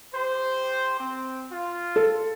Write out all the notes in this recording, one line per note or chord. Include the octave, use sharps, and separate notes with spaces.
G4 C5
C4
F4
A4